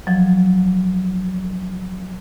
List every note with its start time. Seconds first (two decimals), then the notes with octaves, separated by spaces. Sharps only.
0.07 F3 F#3